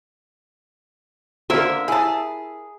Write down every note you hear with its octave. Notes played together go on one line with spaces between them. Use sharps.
D3 A#3 C4 A#4 E5
E4 G#4 A5